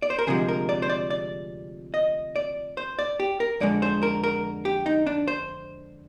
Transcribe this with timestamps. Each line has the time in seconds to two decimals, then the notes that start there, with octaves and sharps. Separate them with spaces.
0.02 D5
0.10 C5
0.19 A#4
0.27 D2 C3 F3 G#3 G#4
0.48 A#4
0.69 D5
0.82 C5
0.90 D5
1.10 D5
1.94 D#5
2.36 D5
2.77 C5
2.99 D5
3.20 G4
3.40 A#4
3.60 F2 D3 G#3 D5
3.82 C5
4.03 A#4
4.24 A#4
4.65 G4
4.86 D#4
5.07 D4
5.28 C5